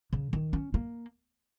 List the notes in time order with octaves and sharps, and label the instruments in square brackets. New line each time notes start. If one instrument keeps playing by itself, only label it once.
[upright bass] C#3
D#3
C#4
A#3